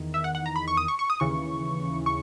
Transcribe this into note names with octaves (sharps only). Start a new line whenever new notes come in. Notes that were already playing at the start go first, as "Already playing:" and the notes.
Already playing: E2 D#3
E5
F#5
F#5
A#5
B5
C#6
D#6
C#6
C#6
D#6
D#2 C#3 E3 C#6
C#6